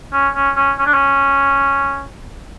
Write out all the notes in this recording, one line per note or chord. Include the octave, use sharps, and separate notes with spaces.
C#4
C#4
C#4
C#4
D4
C#4